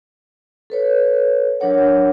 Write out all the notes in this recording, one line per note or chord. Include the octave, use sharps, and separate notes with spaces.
A4 B4 C#5
F#3 D4 A#4 C#5 F#5